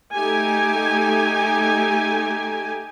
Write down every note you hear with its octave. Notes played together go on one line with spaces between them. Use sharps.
A3 D#4 G4 G#5